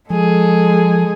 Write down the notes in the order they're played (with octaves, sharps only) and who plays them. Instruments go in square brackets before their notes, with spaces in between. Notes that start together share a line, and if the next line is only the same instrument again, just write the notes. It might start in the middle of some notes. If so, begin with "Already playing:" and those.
[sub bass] F3 [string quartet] G#3 G#4 A4